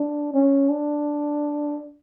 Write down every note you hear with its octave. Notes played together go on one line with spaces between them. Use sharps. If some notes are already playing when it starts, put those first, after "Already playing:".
Already playing: D4
C#4
D4